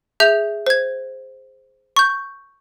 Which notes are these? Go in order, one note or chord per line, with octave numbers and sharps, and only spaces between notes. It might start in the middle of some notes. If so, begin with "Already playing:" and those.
G#4 E5 G6 F7
C5 G#6
C#6 G6